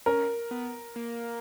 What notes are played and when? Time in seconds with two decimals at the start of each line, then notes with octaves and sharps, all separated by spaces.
0.06 C#4 A#4
0.51 B3
0.96 A#3